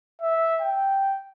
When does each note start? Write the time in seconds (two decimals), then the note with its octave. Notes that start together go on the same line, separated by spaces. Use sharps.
0.21 E5
0.61 G5